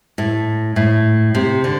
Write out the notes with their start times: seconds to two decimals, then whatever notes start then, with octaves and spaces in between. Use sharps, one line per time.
0.18 A2
0.76 A2
1.35 C3
1.64 D3